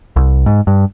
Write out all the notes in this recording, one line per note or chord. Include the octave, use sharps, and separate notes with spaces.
C2
G#2
G2